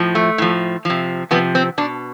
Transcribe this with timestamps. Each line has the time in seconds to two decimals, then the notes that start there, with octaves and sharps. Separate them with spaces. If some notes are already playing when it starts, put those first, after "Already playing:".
Already playing: A2 F3
0.15 A3
0.38 A2 F3
0.85 C3 F3
1.31 C3 F3 B3
1.55 C4
1.78 B2 D4